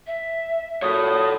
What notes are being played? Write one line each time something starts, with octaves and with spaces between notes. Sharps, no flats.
E5
A#2 F#3 A4 C#5 D#6